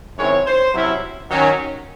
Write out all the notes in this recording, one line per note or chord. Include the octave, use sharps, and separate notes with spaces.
F#2 D#3 G#3 C4 E4 C#5
C5
C3 F#3 C#4 E4
D#3 F#3 C#4